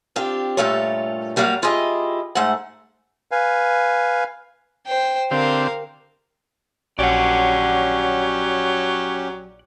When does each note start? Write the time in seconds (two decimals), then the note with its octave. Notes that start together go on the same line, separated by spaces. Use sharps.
0.16 C4 D4 F4 G4
0.57 G2 A#2 A3 F4 A4 C#5
1.36 F#3 G3 A#3 F#4 F5
1.62 E4 F4 G4 G#4 D#5
2.35 G#2 A3 C5 F#5
3.31 B4 F5 G#5
4.87 C5 G5
5.31 D3 C4 G4 A#4 F5
6.99 A#1 F#3 C#4 G4 D5 F#5